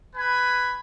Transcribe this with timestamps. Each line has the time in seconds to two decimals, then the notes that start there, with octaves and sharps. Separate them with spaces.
0.16 B4 G#5 B5